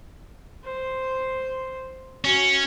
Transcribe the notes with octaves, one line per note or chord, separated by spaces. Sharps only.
C5 C6
C#4 F#4